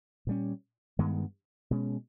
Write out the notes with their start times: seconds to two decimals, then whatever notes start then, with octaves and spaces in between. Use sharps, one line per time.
0.27 A#2 G3 C#4
0.99 G2 D#3 G#3 B3
1.71 B2 G#3 C#4